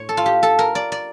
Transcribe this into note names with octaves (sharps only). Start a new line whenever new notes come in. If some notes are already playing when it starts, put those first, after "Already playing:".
Already playing: A2 C#5
A4
F4
G4
A4
A#4
D5
D5